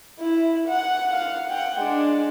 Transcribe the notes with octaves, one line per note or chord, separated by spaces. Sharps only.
E4
F#5
F5 F#5
F#5 G5
G#3 D4